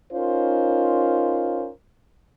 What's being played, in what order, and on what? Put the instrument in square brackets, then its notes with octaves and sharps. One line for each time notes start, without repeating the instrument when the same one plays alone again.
[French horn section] C#4 D#4 F4 A#4 C5